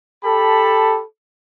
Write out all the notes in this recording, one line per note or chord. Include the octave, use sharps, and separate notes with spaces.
G4 A4 A5 B5